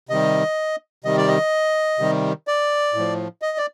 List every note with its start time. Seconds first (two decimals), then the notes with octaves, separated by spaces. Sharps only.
0.09 C3 D#3 G3 D#5
1.04 C3 D#3 G3 D#5
1.17 D5
1.28 D#5
1.99 C3 D#3 G3
2.47 D5
2.94 A2
2.99 F3
3.42 D#5
3.58 D5